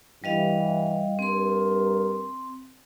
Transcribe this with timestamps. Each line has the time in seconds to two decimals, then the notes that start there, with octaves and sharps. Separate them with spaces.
0.24 G2 E3 G3 D#5 F5
1.19 G2 C4 A#4 C6